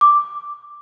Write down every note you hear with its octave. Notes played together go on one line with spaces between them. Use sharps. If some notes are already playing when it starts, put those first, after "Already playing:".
D6